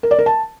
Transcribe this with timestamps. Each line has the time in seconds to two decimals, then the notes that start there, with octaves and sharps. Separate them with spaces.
0.03 A#4
0.11 D5
0.19 A#4
0.26 A5